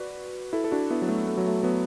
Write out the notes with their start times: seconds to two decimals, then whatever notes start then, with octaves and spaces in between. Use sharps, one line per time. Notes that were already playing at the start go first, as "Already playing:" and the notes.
Already playing: F#4 B4 D5
0.53 E4 A4
0.64 A4
0.72 D4 F#4
0.90 B3 E4
1.02 F#3
1.08 A3
1.27 A3
1.37 F#3
1.47 A3
1.63 F#3 B3